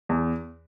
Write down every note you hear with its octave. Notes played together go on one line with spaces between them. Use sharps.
E2